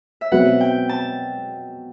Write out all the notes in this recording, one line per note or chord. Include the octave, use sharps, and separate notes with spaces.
E5
B2 F#3 C4 F#4 B4 F#5
G5
A5